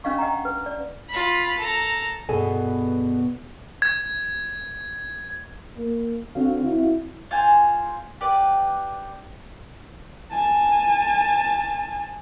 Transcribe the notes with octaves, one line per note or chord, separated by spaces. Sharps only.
C#4 D4 D#5 F5 C#6
D#5 F#5 G5 A#5
B4
D5
F4 B5
A4 A#5
G2 B2 B3 G#4 A4 G#5
G#6
A#3
D3 C4 F#4 F5
E4
F4 C5 G#5
G4 B4 D5
G#5 A5